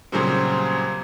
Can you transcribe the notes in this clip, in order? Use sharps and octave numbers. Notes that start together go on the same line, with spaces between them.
A#2 C#3 F#3 G3 C4